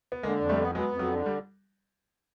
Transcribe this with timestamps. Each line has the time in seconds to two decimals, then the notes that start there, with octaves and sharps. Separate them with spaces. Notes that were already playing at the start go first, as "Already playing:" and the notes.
0.12 B3
0.23 D3 G#3 A#3
0.41 F2
0.49 G3 A3
0.58 B3
0.75 F#3 G#3 B3
0.92 F2
0.99 F#3
1.09 D3
1.26 G3